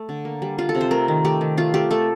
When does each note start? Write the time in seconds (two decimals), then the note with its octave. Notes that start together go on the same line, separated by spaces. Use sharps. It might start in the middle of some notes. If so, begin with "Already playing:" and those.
Already playing: A3
0.09 D3
0.25 A#3
0.42 G3
0.58 G3 F4
0.69 A4
0.75 C3
0.81 C5
0.91 A3 A#4
1.08 D#3
1.24 A3 G4
1.41 D#3
1.57 A3 F4
1.74 A3 G4
1.91 A3 A4